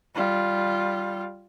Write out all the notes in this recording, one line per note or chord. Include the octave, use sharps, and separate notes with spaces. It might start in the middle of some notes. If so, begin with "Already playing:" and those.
G3 F4